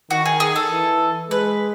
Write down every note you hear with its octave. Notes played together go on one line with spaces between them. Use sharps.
D#3 F#4
G#4
G#4
A4
E3
G#3 B4